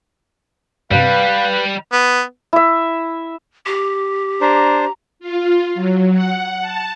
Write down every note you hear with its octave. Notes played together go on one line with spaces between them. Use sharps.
G2 C3 G3 B4 F5
B3
E4 E5
G4
D4 C5 A#5
F4
F#3
F#5
A5